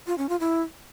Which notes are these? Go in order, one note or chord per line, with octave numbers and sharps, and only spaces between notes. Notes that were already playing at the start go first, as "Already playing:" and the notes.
F4
C#4
F4
E4